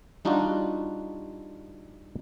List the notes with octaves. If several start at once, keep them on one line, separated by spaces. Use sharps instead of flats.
G3 D4 D#4 F4 F#4